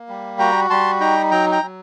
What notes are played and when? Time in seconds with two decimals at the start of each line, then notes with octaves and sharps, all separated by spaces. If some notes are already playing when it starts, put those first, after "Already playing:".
Already playing: A#3
0.09 G3
0.39 F#4 G5 A#5
0.70 G3 A5 C6
1.00 D#4 G5 A#5
1.31 F#3 G5 A#5
1.52 G5 A#5
1.62 F#3